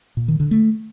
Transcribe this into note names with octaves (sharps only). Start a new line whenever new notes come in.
A#2
D#3
D3
A3